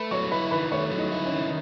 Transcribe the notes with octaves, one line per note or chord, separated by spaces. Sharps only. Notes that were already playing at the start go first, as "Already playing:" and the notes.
Already playing: A3 B4 B5
F#3 C#5 C#6
E4 B4 B5
D#3 B4 B5
A3 C#5 C#6
F#3
D#4 D#5
E4
C#4 C#5
D#3